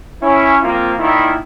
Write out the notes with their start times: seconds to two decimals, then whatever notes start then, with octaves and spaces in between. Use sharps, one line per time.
0.21 C#4 E4
0.62 F3 A#3 C4 F4
0.99 A#2 D#3 E4